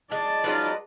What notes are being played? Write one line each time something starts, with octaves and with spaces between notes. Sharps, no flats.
G#3 D5 A5
F#3 G#3 C#4 D#4 F4 B4